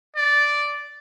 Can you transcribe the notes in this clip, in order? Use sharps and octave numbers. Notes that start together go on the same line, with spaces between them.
D5